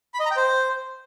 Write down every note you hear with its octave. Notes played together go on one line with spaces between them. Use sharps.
B5
D#5
A#5
G5
C5